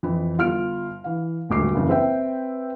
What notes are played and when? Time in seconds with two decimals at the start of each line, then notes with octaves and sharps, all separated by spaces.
0.03 F2 E3 E4
0.38 G1 F4 F6 D7
1.04 E3 F5
1.49 D#1 G#1 D2 D6 C7
1.75 F#1 C#3 E3
1.89 C4 B4 E5 G5